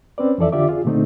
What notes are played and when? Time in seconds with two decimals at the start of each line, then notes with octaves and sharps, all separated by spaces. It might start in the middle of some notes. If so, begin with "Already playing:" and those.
0.18 C4 C#4 B4 D5
0.38 F2 E3 A4 D5 E5
0.52 D3 F4 G4 D5 E5 D6
0.68 F4 G#4
0.85 A#2 D3 A3 C4 D#4